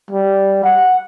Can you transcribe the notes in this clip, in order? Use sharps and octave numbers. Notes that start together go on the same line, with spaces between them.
G3
F#5